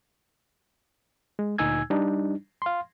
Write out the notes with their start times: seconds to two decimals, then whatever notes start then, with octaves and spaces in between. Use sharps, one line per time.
1.39 G#3
1.58 D2 A#2 D#4 G#5 E6 G#6
1.90 G3 D4 D#4
2.62 F5 C6